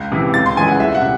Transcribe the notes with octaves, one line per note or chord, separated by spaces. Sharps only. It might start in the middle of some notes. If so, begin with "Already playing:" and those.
Already playing: C#2
C3 E3
C#2 A6
C6
C#3 E3 G#3 G#5
F#5
C2 E5
F#5
C3